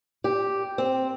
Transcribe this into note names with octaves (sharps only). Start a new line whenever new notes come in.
G4
C4